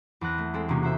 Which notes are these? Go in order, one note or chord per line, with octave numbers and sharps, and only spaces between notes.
E2 C4 F#6 A#6
A3
G#3 C4 A4
E1 C3 A#3 C#4
F#4 C5 E5 G6